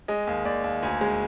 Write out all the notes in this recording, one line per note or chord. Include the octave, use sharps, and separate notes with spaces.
G#3 D#5
D#2
D#2 D5
D#2
D2 G#5
G#3